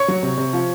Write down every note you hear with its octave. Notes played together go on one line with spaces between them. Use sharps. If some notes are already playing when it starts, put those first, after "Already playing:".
Already playing: C#5 C#6
F#3
C3
C3
F3